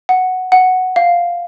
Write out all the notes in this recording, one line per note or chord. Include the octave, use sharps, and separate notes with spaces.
F#5
F#5
F5